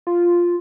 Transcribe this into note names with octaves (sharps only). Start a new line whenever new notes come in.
F4